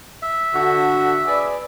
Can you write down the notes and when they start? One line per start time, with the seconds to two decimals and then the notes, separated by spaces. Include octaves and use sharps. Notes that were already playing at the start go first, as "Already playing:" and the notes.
0.22 E5
0.54 D3 F#4
1.27 G#4 B4 D5